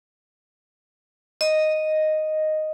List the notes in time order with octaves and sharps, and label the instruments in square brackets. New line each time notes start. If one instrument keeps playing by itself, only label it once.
[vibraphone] D#5